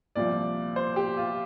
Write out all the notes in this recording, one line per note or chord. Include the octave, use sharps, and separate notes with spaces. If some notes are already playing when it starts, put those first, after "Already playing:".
C2 A#2 F3 D5
C5
G4
F4